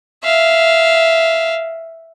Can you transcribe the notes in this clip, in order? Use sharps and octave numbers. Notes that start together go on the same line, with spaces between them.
E5 F5